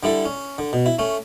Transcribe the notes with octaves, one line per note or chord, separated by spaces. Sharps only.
D3 G3 E4 A4
C#4
D3
B2
E4
A3 C#4